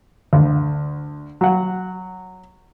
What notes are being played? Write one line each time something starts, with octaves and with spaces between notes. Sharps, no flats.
D2
F#3 F#5